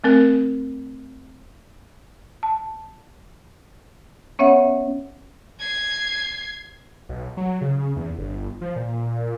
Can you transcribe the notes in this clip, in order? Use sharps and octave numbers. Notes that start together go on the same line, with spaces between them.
A3 C4 A#4
A5
B3 C#4 C#5 E5 F#5
G#6 C7
B1
F#3
C#3
E2
G1
F3
A#2